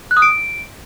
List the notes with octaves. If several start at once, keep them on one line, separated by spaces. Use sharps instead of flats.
F#6
D#6
D7